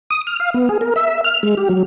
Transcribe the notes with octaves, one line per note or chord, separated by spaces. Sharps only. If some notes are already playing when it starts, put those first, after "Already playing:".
D#6
F6
F5
B3
G#4
A#4
E5
F6
G#3
G4
F#3